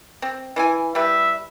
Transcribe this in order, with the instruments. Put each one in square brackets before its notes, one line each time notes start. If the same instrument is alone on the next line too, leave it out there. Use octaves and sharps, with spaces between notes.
[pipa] C4
E3 E4 G#5
[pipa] G3 E4 B4 [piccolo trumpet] E5